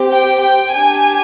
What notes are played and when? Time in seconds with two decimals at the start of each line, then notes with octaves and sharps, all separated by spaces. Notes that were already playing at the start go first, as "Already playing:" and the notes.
Already playing: C4 G4
0.10 G5
0.41 G5
0.73 D4 G4 G#5